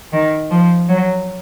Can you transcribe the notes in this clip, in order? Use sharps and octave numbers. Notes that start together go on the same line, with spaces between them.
D#3
F3
F#3